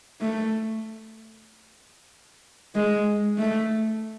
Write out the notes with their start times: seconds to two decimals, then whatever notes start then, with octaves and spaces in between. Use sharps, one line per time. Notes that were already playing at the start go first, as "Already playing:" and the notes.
0.21 A3
2.75 G#3
3.38 A3